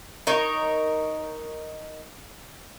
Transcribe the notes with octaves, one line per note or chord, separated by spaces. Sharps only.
D#4 A#4 C#5